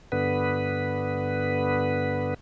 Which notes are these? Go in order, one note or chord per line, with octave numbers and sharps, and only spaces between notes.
G2 D3 B3 B4